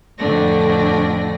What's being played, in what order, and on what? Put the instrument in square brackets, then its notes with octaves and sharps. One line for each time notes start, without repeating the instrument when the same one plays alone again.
[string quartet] F2 A2 D3 A3 D4 A#6